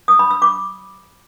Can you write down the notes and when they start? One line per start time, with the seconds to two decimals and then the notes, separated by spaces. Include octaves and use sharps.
0.08 D#6
0.19 B5
0.31 E6
0.42 D6